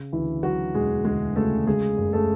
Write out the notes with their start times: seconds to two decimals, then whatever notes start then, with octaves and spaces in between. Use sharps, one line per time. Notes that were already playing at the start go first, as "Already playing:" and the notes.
Already playing: C#3
0.12 D2 E3 E4
0.43 F#3 F#4
0.74 E1 G#3 G#4
1.05 D2 G#3 G#4
1.36 C#3 A3 A4
1.67 C#3 G#3 G#4
1.97 F#1
2.13 A3 A4